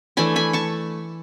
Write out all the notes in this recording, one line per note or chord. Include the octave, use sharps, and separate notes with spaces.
E3 A3 D4 G#5 B5
G#5 B5
A5 C#6